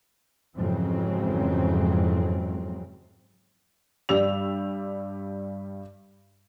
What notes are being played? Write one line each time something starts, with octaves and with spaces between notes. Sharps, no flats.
F2 G#2 C#3 E3 F#3 C4
G2 G3 E6 F7